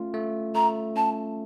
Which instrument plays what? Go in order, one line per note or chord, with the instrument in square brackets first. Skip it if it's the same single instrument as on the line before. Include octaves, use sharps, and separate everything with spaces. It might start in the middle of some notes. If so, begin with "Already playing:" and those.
Already playing: [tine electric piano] A3 C#4 F4
A3
[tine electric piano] A3 [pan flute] A#5
[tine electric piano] C#4 [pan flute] A5